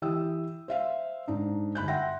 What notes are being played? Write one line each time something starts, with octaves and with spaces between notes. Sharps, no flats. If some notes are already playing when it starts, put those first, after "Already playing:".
E3 G4 G5 D#6 E6
C5 E5 F5
G#2 D4 D#4
G1 B5 F#6 G6
E5 F#5 G5 C6 A#6